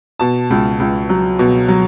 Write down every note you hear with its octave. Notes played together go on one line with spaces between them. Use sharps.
B2 A5
C#2
C#2
F#3
B2
F#3